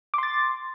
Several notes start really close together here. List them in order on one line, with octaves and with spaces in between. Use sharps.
D6 C6 A6